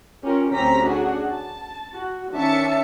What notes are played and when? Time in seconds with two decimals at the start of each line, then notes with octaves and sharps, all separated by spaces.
0.23 C#4 F4 G4 A#4
0.52 D2 C4 C#4 G4 A#5 B6
0.85 C#4 D4 F#4 G#4 F#5
1.30 A5
1.95 F#4
2.33 D#3 C#4 D4 E5 A5 C#7